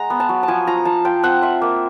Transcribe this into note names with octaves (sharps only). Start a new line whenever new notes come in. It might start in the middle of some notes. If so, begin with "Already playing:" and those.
Already playing: G#3 F#5 A#5
B3
A5
F#3
A5
F3 G#5
F3 A#5
F3 A5
F4 G5
C4 F#5
F4 E5
A#3